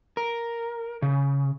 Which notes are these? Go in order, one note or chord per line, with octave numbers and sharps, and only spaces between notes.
A#4
C#3